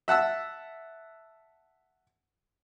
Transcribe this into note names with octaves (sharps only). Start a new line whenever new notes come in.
E5 F#5 A5 E6